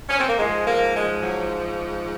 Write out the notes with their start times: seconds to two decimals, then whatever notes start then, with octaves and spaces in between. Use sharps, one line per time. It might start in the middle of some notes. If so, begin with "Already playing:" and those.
0.09 C#4
0.19 C4
0.28 A#3
0.37 G#2 F3 G#3
0.65 A#3
0.94 G#3
1.21 F#3